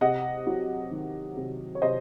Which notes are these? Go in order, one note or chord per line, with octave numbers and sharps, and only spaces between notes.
C3 D#5 F#5
F#3
D#3
C3
C#5
C3 C5 D#5